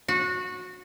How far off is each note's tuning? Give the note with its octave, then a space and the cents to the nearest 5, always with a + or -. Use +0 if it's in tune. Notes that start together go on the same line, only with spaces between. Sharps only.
F#4 -20